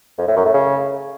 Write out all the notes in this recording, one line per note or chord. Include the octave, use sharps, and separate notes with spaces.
F2
A2
F#2
A2
C#3